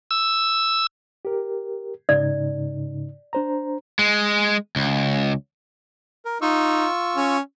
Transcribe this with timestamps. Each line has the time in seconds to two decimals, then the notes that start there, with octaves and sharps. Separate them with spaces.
0.11 E6
1.25 G4 A#4
2.09 G#2 C#3 D#4 D5
3.33 D4 C5 A#5
3.99 G#3
4.76 C#2
6.25 A#4
6.42 D#4 F4 C#6 E6
7.16 C#4